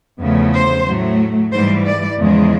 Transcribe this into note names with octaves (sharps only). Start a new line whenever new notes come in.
E2 C#3 F3 A3
C5
A2 F#3 A3
G#2 E3 G3 C5
D5
E2 C#3 F3 G#3